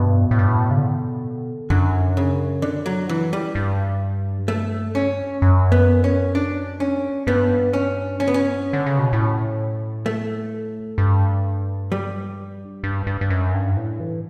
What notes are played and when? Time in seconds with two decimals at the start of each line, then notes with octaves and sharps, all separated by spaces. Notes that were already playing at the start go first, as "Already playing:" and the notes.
Already playing: G2 B2
0.31 A2
0.39 G2
0.48 A2
0.71 C#3
0.78 D3
1.70 F#2 D3
2.17 C#3
2.62 D3
2.86 F#3
3.09 E3
3.33 G3
3.55 G2
4.48 A3
4.95 C#4
5.42 F#2
5.72 B3
6.04 C#4
6.35 D4
6.80 C#4
7.27 G2 B3
7.73 C#4
8.20 C#4
8.28 B3
8.34 C#4
8.73 D3
8.86 C#3
8.99 B2
9.13 A2
10.06 A3
10.98 G2
11.92 G3
12.84 G2
13.07 G2
13.21 G2
13.30 F#2
13.54 G2
13.77 A2
14.00 E3